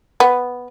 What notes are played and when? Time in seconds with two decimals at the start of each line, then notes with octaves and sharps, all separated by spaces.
0.20 B3